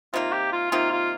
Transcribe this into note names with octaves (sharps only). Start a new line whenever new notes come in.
C3 D#3 A#3 F4
G4
F4
C3 D#3 A#3 F4
F4